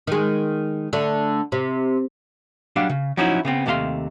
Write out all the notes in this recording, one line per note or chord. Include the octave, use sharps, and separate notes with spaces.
D#3 G#3
D3 A3
C3
F#3 G3 D4 F5
C#3
F3 F#3 C#4 D#4 E4 F#4
C#3 B3 C4
D#2 C3 A3 A4 F5 C6